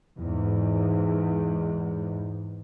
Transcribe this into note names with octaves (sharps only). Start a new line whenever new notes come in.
E2 G#2